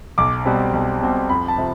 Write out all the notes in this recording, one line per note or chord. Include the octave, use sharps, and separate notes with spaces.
B1 D6
B2 G3 C4
B1
B2 G3 C4
F2 B5
A5
C3 F3